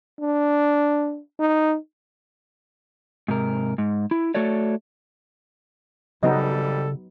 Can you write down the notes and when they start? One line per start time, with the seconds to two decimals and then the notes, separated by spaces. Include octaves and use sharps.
0.20 D4
1.39 D#4
3.28 G#2 C3 A#4
3.78 G#2
4.11 E4
4.35 A3 F#4 A4 C#5 D5
6.23 G#1 C#3 F#3 G3 B3 D#4 A4 D#5